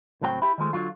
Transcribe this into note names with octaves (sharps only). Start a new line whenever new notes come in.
C#2 A2 F#3 C4 A4 G5
E4 G4
D#3 F3 G#3 A3
D3 F#3 F4